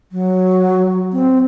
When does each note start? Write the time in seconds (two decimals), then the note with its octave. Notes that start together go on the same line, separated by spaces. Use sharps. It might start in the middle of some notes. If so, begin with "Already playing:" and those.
0.12 F#3
1.12 C4